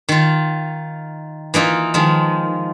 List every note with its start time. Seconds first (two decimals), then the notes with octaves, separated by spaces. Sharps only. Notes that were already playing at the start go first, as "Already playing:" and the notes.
0.09 D#3 F4
1.54 E3 A#3 D#4 F4
1.94 D#3 F3 G#3